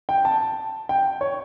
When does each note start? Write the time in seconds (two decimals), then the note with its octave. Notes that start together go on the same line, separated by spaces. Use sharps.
0.09 G5
0.25 A5
0.89 G5
1.21 C#5